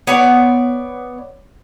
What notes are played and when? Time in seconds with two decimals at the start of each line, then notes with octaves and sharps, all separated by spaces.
0.07 B3 C#5 D5